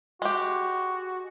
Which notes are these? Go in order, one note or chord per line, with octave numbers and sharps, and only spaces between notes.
G#3 F#4 G4